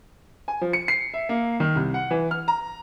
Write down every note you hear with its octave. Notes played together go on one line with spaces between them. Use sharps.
G#5
F3
C#7
C7
E5
A#3
D#3
C2
F#5
E3
F6
A#5